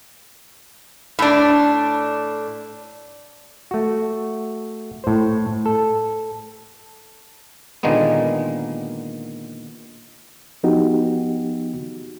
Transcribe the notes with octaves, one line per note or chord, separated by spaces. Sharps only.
A2 D4
A3 F#4
A2 C5
A4
A#2 D3 D#3 G#3 A#3 B3
F3 B3 D#4 F#4 G4